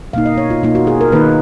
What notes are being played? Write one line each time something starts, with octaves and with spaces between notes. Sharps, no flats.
B2 A#3 D#4 F5
D#5
C#5
F4
B2 A#3 D#4 F4
F#4
G#4
A#4
D#3 A#3 D#4 B4